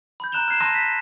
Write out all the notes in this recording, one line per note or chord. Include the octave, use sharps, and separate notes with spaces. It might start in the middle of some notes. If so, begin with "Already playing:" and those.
B5 G6
A#5 F#6 E7 F7 G7
F6 F#6 G#6 C7 E7 F7
A5 C6 E6 F#6 A#6 D#7
B6